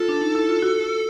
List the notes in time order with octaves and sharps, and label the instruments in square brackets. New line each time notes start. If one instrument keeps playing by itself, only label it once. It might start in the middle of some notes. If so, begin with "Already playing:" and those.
Already playing: [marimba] F4 [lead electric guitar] A4
[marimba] D4
D#4
E4
F4
F#4